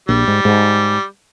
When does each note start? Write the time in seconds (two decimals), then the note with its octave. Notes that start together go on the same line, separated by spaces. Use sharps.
0.09 A#1 G3
0.28 G#2
0.45 G#2